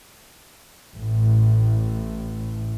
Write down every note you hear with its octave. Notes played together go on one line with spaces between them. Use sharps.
A1 A2